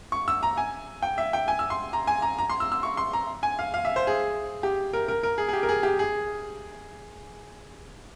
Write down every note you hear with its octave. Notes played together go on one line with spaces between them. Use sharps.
C#6
E6
A#5
G#5
G5
E5
G5
G#5
E6
C6
A#5
G#5
A#5
A#5
C6
E6
E6
C#6
C6
A#5
G#5
F5
F5
E5
C5
G#4
G4
A#4
A#4
A#4
G#4
G#4
G4
A#4
G#4
G4
G#4